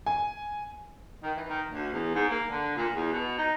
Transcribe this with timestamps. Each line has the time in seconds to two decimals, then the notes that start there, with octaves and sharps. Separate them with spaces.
0.06 G#5
1.24 D#3
1.37 E3
1.49 D#3
1.71 D2
1.93 E2
2.15 G#2
2.30 A#3
2.51 D3
2.77 A#2
2.94 E2
3.13 B2
3.38 D#4